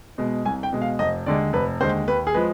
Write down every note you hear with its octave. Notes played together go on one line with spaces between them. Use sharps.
B2 G#3
C2 G#5
G5
B2 G#3
F5
F1 D#5
D#2 D3 G#3 D5
F1 B4
D#2 D3 G#3 C5
D#2 B4
G#4
F3 G#3 B4